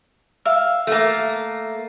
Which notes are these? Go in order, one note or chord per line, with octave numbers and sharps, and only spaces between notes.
E5 F5
A3 A#3